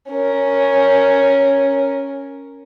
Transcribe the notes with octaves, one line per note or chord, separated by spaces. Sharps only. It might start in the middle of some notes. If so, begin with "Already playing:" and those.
C#4 A#4